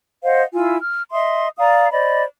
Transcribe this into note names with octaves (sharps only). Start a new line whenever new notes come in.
C5 D#5 F5 F#5
E4 F4 G#5 E6
F6
D#5 E5 C6 D#6
D5 F5 A#5 D#6
C5 D5 D#5 B5